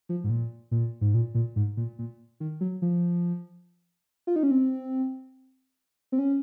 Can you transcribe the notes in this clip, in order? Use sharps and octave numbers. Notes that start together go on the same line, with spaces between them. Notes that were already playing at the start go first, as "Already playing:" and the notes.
F3
G#2
A#2
A#2
G#2
A#2
A#2
G#2
A#2
A#2
D#3
F#3
F3
F4
D#4
C#4
C4
C4
C#4